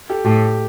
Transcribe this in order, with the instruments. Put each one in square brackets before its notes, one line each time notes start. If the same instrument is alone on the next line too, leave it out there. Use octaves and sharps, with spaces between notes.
[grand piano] G4 A4
[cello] A2 [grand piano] G4 A4